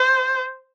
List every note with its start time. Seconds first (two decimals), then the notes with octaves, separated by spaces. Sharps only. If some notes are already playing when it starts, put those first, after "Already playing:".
Already playing: C5